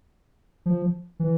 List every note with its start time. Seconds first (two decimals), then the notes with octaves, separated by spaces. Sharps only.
0.66 F3
1.20 E3